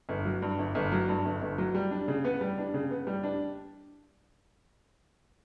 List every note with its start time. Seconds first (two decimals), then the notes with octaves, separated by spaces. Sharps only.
0.09 G1
0.25 F#3
0.42 G2
0.59 G1
0.75 G1
0.92 F#3
1.09 G2
1.25 G1
1.41 G1
1.58 F#3
1.75 G3
1.91 D4
2.08 C#3
2.24 B3
2.41 G3
2.58 D4
2.74 C#3
2.90 B3
3.07 G3
3.23 D4